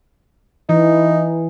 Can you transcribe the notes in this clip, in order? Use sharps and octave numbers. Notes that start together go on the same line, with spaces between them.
E3 D#4